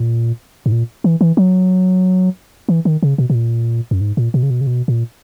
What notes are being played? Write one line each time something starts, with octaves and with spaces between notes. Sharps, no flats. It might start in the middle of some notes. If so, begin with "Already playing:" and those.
Already playing: A#2
G#2
A#2
E3
E3
F#3
E3
D#3
C#3
B2
B2
A#2
F#2
G#2
A#2
B2
C#3
B2
C#3
B2
A#2